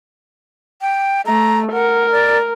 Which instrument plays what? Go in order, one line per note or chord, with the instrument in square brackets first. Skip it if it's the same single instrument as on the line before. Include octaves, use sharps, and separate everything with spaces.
[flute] G5
[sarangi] A3 [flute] A#5
[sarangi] A#4 [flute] F#5
[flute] D5